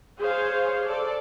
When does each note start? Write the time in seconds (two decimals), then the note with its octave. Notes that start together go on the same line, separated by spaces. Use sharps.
0.19 G#4 C5 C#5 F5
0.83 A4 D5